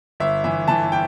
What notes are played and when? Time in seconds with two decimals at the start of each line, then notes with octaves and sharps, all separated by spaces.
0.20 G1 E5
0.44 E3 E5
0.68 E3 A5
0.92 G5